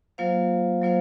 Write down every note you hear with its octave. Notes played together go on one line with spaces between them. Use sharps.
F#3 A#3 F4 C5 F5
F#3 A#3 F4 C5 F5